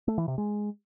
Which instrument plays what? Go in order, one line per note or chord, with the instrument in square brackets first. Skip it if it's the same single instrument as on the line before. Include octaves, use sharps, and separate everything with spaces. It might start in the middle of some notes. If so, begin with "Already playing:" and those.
[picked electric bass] A3
E3
C3
G#3